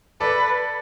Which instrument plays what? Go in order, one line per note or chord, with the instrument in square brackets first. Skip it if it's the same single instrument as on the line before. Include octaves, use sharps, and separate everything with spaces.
[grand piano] A4 D5 [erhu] B4